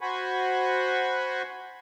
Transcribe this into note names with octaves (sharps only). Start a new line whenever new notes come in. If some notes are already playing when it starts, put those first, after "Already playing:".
F#4 C5 F#5 G#5 B5 C#6